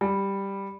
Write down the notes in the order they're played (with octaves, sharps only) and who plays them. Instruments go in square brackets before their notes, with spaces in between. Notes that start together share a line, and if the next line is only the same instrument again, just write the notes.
[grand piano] G3